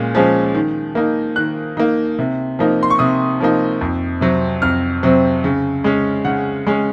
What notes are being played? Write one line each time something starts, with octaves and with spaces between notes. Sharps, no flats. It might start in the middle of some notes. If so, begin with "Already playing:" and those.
Already playing: A#2 G#3 C#4
F3 G#3 C#4
D#3
A#3 D#4
D#3 F#6
A#3 D#4
C3
F3 A#3 D#4
C6
C#6
C3 D#6
F3 A#3 D#4
F2
C3 F#3 C4
F2 F6
C3 F#3 C4
C#3
G#3 C#4
C#3 F#5
G#3 C#4